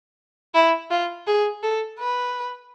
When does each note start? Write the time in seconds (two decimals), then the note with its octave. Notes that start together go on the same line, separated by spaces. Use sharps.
0.54 E4
0.90 F4
1.27 G#4
1.63 A4
2.00 B4